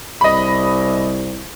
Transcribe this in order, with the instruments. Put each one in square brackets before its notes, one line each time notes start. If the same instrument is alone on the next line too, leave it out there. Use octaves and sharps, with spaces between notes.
[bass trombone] C2 [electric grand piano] D#5 B5